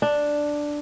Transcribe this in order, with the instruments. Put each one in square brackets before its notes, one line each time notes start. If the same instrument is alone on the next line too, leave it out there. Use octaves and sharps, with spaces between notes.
[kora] D4